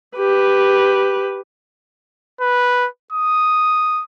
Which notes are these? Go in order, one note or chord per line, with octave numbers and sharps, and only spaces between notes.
G4 B4
B4
D#6